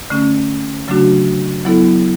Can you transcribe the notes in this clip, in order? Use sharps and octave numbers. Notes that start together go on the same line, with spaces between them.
D3 A3 C#4
C#3 F#3 A3 D4 F#4
F#3 B3 E4 A4